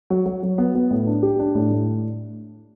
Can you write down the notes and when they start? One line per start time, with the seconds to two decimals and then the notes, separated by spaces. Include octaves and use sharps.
0.10 F#3
0.26 F#3
0.43 F#3
0.58 B3
0.75 B3
0.91 A2
1.07 D4
1.23 G4
1.39 D4
1.55 A2
1.70 A2